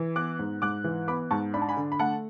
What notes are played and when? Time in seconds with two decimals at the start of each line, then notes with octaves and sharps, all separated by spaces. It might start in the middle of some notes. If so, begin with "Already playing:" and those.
Already playing: E3
0.16 B3 D6 F#6
0.39 G#2
0.62 G#2 D6 F#6
0.84 E3
1.08 B3 B5 D6
1.31 G#2 A5 C#6
1.54 D4 B5
1.62 A5
1.69 G#5 B5
1.77 D3
1.92 B5
1.99 A3 F#5 A5